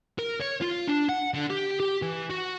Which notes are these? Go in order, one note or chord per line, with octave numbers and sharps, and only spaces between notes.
A#4
C#5
F4
D4
F#5
D3
G4
G4
E3
F#4